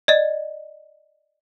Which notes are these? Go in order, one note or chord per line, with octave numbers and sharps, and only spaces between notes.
D5 D#5